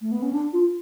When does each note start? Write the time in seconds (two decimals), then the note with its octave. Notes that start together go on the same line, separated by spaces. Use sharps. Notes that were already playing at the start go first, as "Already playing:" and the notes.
0.01 A3
0.11 B3
0.22 C#4
0.33 D4
0.53 F4